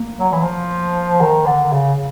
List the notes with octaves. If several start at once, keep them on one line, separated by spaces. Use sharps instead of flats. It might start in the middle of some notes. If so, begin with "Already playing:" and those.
Already playing: A#3
F#3
E3
F3
D#3
D3
C#3